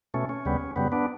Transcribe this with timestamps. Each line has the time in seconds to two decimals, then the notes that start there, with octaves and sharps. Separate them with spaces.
0.14 B2 A3 C#4
0.29 C#4
0.45 D2 C#3 G3 B3
0.76 F#2 C#3 G3 B3
0.92 B3 D4